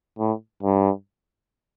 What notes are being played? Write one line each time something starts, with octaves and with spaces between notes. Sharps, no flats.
A2
G2